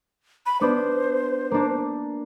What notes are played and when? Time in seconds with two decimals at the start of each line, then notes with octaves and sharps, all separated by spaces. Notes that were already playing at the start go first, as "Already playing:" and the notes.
0.46 B5
0.61 B3 D4 C5 D5
1.51 A#3 D4